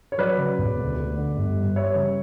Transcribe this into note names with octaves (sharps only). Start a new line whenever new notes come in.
C#5
F#3 B4 D5
C#3
E1
D2
A3
D3
G1
G2
G3 C#5 E5
C#3